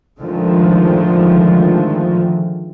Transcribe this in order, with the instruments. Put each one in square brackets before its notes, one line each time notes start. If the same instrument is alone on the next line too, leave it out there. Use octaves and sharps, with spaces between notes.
[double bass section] D3 D#3 F3 G#3 A3